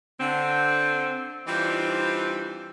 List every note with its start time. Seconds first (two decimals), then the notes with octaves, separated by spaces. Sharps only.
0.20 D3 C4
1.47 E3 G3 C4 D4 D#4 F4